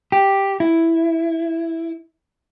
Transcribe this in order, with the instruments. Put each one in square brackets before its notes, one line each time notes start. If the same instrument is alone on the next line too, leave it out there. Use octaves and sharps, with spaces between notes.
[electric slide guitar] G4
E4